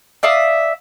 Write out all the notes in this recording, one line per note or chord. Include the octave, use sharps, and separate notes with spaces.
D5 E5 F5 D#6